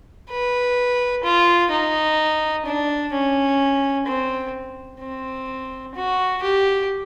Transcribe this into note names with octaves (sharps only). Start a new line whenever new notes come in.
B4
F4
D#4
D4
C#4
C4
C4
F#4
G4